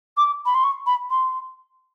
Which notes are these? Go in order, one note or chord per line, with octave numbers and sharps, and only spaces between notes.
D6
B5
C6
C#6
B5
C6